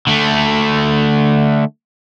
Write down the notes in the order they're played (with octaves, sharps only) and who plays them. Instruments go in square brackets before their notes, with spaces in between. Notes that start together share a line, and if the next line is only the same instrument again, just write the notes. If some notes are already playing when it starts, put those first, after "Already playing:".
[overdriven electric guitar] D3 A3